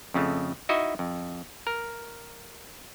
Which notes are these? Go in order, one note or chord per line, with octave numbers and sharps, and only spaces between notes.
F2 C#3 A3
D#4 E4 F#4 D#5 E5
F2
A#4